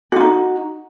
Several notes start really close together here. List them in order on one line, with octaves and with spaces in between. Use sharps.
F#4 F4 D#4